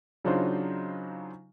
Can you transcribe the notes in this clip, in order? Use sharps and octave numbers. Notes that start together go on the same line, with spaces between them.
C#3 F#3 D4 D#4 F4 C5